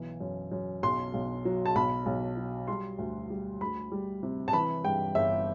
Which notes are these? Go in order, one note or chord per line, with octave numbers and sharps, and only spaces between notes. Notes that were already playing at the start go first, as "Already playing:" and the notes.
Already playing: B1 E3
F#2
F#2
B1 C6
B1
F#3
A5
B1 B5
B1
F#3
G3 C6
D2
G3
D2 B5
G3
C3
A5
E3 B5
G2 G5
G1 E5